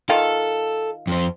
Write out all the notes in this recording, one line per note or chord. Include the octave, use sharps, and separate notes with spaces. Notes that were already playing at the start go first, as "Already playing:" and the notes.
D#3 F4 A4 F5
F2 C5